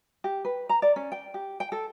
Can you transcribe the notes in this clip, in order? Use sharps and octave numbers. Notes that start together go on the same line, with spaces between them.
G4
B4
A#5
D5
C#4
G5
G4
G5
A4